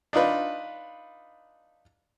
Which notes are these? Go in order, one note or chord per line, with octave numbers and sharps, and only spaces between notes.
D4 D#4 F4 B4